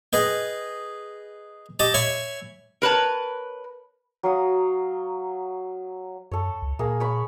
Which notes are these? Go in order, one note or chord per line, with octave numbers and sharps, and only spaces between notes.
G#4 B4 D#5 G5
G4 D#5 A5 D#6
C#5 E5 G#5 B5
A#4 B4 C#5 A5
F#3 F5 D#6
F#2 A4 C#5
C#2
A#2 A#3 G#4
C#5 B5 C#6